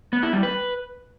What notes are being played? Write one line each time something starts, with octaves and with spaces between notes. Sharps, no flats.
B3
E4
G3
B4